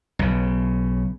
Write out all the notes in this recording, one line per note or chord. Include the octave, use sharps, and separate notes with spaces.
B1 C#3